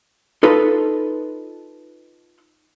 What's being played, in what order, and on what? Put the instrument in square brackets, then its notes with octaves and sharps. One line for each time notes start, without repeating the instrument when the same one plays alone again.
[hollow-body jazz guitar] D#4 F4 A4 B4